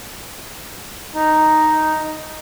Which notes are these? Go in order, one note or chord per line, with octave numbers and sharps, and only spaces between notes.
D#4